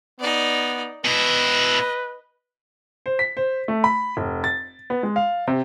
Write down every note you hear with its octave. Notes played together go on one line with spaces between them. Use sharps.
B3 D#4 D5
B2 E4 B4 D#5
C5
B6
C5
A3
B5
F1
A6
B3
G#3
F5
C3